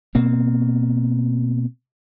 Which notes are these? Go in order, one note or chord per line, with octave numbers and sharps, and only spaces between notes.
B2 A#3 C4